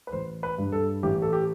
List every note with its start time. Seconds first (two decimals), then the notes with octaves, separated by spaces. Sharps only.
0.07 B4
0.12 A1 C5
0.43 B4
0.58 G2
0.72 A4
1.03 A1 G4
1.22 A4
1.33 G4